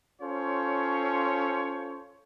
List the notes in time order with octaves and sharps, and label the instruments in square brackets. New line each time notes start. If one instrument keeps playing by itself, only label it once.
[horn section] C#4 F4 A4 C5 C#5